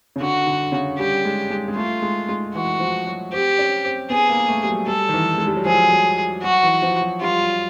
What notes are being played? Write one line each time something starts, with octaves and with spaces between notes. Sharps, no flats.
C#3
D3 F#4
D3
C#3
G3 G4
G#3
G#3
G#3
A3 F4
G#3
G#3
E3 F#4
F3
F#3
C4 G4
C#4
C4
B3 G#4
A#3
A3
G3
F#3
G3 A4
D#3
E3
G#3
G3
F#3
F3 G#4
F#3
F#3 F#4
E3
F3
F#3
G3 F4